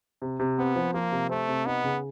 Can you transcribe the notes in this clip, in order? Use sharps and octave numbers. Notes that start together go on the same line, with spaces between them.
C3
C3
B3 C4
F3
F3 A#3
C3
A3 C4
C3
B3 D#4
C#3